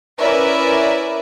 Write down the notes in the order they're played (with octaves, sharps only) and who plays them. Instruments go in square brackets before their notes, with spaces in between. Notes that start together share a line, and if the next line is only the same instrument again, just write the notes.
[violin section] C#4 E4 A#4 B4 D5 E5